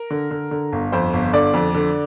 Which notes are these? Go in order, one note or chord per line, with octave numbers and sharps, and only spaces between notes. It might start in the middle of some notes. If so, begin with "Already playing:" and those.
Already playing: A#4
D3
D3
D3
G1
F2 C5
G1
D3 D5
F2
D3